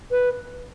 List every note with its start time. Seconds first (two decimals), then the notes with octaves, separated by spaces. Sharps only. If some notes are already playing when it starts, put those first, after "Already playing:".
0.11 B4